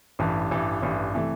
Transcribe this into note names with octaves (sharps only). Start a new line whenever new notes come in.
A1 G2 E3
A1 G2 E3
A1 G2 E3
C3 E3 A3